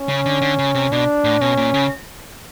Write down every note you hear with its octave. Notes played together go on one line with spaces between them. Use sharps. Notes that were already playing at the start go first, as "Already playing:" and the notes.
Already playing: C#4
C#3
D3
D3
C#3
C3
B2 D4
A2
B2 C#4
A#2
C#3